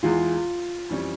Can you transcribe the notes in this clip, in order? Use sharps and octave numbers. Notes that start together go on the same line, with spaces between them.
E2 E3 G#3 F4
F2 E3 G3 C#4